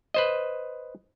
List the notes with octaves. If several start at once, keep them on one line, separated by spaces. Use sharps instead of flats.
B4 C5 D#5